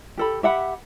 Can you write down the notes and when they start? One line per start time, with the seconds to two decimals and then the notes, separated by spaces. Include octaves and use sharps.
0.17 G4 A4 B5
0.43 G4 E5 F#5 B5